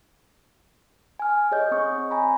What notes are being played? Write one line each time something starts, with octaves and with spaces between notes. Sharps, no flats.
G#5 F6
G#4 C#5 D#5 G6
C4 G#4 C#6 D#6
G#5 A#5 B5